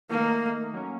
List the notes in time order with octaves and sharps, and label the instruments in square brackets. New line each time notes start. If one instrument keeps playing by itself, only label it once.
[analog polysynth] D#3 A3 D#4 [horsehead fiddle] A#3
[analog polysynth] F#3 A#3 C#4